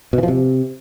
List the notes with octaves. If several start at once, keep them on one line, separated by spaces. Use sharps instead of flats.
B2
E3
F3
C3